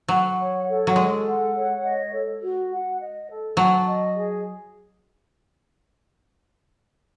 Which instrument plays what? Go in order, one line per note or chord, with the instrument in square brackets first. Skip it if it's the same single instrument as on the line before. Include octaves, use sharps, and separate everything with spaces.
[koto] F#3 [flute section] F#5
[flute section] C#5
A4
[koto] F#3
[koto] G#3 [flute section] A4
[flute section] F#5
C#5
D#5
A4
F#4
F#5
D#5
A4
[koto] F#3 [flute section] A5
[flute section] D#5
G#4